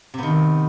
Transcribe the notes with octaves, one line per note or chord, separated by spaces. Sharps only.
C3 D#3 B3